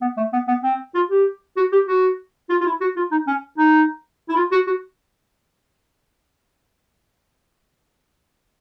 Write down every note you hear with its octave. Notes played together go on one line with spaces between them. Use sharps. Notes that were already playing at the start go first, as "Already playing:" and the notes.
B3
A3
B3
B3
C4
F4
G4
F#4
G4
F#4
F4
F4
E4
F#4
F4
D#4
C#4
D#4
E4
F4
F#4
F#4